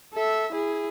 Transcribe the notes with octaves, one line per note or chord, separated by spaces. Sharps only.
A4 E5
E4 G#4